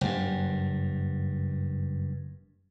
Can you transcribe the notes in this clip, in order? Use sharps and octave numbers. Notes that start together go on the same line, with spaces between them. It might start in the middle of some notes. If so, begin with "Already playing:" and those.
F#1 G2